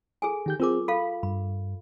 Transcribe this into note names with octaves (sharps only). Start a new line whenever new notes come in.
G#4 A4 G#5
D#3 G4 G6
C4 F4 G#4 A#4 D6
A4 F5 B5
G2 B5